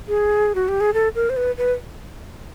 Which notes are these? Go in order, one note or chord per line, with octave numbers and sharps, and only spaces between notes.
G#4
F#4
G4
G#4
A4
A#4
C5
B4
B4